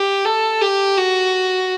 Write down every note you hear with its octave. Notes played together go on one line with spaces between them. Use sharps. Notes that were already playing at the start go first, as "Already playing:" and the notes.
Already playing: G4
A4
G4
F#4